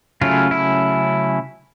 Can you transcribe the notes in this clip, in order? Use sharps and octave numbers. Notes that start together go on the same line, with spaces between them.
C#3 F#3 A3 C#4 E4 F4
E4